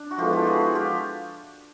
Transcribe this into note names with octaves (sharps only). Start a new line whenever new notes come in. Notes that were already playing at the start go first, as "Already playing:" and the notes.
Already playing: D4
F#4
F3 G#3 B3 E4 F4 G4 A4
F4 G4
F#4 G#4
F4 G4